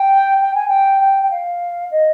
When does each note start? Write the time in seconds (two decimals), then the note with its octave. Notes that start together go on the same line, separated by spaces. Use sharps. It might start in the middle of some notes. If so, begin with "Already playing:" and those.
Already playing: G5
0.41 G5
0.55 G#5
0.68 G5
1.01 G5
1.23 G5
1.31 F5
1.91 D#5